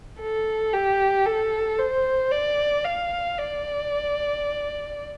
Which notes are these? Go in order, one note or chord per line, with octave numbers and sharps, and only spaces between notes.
A4
G4
A4
C5
D5
F5
D5